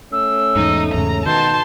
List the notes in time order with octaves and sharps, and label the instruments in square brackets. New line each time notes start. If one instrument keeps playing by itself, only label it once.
[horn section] A3 C#4 [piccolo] E6
[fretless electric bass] E2 G#2 [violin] D#4
[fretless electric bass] E2 G#2 C#3 [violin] A#5
[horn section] B2 [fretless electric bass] D#3 [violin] A5 C6 [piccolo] G6